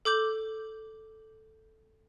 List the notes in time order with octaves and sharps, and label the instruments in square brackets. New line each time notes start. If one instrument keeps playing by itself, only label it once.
[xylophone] A4 D6 G6 F#7